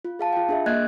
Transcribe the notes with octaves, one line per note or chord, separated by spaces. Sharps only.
F4
G#4 F5 A5
F4 G5
D4 G#4 E5
A#3 D#5 F#6 G#6